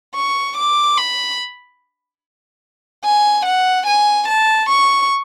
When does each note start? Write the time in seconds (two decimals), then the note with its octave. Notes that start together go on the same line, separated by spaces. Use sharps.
0.15 C#6
0.57 D6
0.98 B5
3.04 G#5
3.45 F#5
3.86 G#5
4.28 A5
4.69 C#6